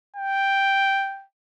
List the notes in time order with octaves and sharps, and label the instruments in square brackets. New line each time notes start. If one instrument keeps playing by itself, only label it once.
[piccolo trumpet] G5